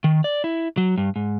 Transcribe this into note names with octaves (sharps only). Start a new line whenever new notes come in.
D#3
D5
E4
F#3
G2
G#2